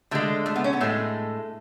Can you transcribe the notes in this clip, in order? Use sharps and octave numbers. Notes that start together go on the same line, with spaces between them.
D3 G#3 A3
A3
B3
C#4
B3
A2 G#3 A3